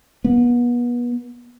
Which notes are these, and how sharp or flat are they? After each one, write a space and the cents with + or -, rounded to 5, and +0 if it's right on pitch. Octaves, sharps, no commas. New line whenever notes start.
B3 -35